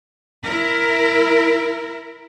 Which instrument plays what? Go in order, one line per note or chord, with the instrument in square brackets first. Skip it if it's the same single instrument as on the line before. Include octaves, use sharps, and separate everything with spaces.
[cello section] E4 A#4